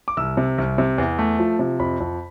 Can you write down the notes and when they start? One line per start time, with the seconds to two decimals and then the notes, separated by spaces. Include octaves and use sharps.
0.08 D6
0.17 C2 E6
0.37 C3
0.58 C2
0.78 C3
0.98 E2
1.19 A3
1.39 F3
1.59 C3
1.80 F2 B5
2.00 F2